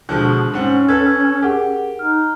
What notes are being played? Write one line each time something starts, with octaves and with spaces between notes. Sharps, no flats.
B2 D3 F3 G#3
G#2 C4 C#4 F#5
A4 B4 G#6
G4 G#4 A#4 F#5
D#4 F6